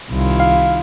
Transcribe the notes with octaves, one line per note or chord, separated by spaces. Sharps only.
C2 D#3 E4 F4
F5